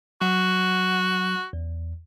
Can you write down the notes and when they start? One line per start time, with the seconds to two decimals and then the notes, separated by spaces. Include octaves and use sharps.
0.22 F#3 F#4 F#5
1.53 E2